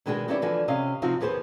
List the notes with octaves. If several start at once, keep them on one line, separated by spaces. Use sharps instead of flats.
B2 D#3 G#3 D4 F#4 G#4
B3 C#4 D#4 E4 G4 D5
D3 E3 F3 D4 F#4 G#5
C3 C#4 G4 D#5 F5
C3 F3 C4 D#4 F4 F#4
D#2 B3 G#4 B4 C5